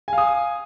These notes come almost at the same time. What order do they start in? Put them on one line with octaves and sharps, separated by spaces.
G#5 F5 D#6